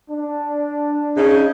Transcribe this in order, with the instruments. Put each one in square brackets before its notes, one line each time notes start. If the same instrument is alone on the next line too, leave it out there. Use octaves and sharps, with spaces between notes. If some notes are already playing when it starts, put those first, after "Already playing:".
[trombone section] D4
[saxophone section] C#3 D#4